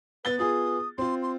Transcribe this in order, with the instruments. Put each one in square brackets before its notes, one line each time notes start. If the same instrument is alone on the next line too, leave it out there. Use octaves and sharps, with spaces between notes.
[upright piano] B3 A6 G7 [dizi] B4
[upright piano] B3 F4 G#4 [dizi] D#6
[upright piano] C4 F4 [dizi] C6
[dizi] C6